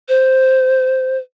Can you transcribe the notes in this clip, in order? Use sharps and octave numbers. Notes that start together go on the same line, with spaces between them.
C5